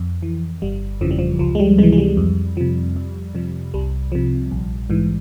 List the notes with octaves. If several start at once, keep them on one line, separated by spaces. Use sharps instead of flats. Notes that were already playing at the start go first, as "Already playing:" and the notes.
Already playing: F2
E3
G1 G3
F2 C#3 E3 F3
G3
F3
C#2 F3
G#3
G3
C3 E3 G#3
G#3
G3
F2
C3 F3
F2
C3 F3
C2 G3
C3 F3
A#1
G#2 E3